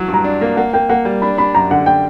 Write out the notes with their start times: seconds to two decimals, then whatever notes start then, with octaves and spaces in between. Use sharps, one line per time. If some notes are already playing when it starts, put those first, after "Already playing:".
Already playing: E3 F#3
0.08 G2
0.14 A#5
0.24 D4
0.41 A#3
0.57 A#3 F#5
0.73 A#3 G5
0.89 A#3 F#5
1.05 G3
1.22 D4 B5
1.38 D4 B5
1.55 F#2 A#5
1.71 D3 F#5
1.86 G5